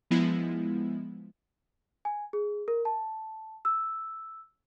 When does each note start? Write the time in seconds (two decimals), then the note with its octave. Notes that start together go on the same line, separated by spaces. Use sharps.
0.11 F3 G#3 B3 E4
2.05 G#5
2.33 G#4
2.68 A#4
2.85 A5
3.65 E6